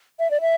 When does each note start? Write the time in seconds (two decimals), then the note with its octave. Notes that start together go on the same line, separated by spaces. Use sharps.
0.20 E5
0.31 D5
0.41 E5